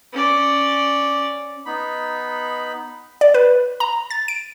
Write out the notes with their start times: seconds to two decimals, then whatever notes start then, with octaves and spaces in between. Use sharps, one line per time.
0.13 C#4 D5
1.65 B3 D#4 B5
3.21 D5
3.34 B4
3.80 A#5
4.10 A6
4.28 D7